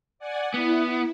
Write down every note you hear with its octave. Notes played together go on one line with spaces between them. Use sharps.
D5 F#5 G#5
B3 E4